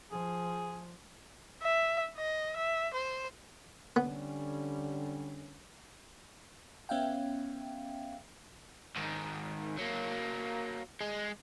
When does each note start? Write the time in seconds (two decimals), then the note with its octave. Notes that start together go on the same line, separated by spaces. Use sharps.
0.12 F3 G#4
1.62 E5
2.18 D#5
2.57 E5
2.94 C5
3.96 D3 G3 B3 C#4
6.89 B3 C#4 E5 F5 G5
8.96 G#2 D#3
9.78 F#3 A#3
11.01 G#3